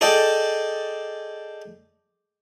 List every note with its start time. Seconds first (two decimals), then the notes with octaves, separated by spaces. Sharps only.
0.01 G#4 A4 D5 D#5 G5